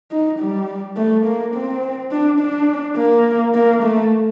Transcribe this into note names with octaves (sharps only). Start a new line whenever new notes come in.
D#4
G3
A3
A#3
C4
D4
D4
A#3
A#3
A3